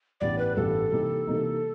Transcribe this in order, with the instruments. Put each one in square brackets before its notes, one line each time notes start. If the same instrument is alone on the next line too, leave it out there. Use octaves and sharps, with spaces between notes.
[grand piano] A1 G2 E3 G3 B3 [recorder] D5
[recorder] B4
[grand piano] A1 G2 E3 G3 B3 [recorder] A4
[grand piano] C3 E3 G3 A#3 D#4
C3 E3 G3 A#3 D#4